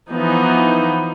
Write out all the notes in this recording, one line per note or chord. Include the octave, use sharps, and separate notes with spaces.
E3 F3 B3 D#4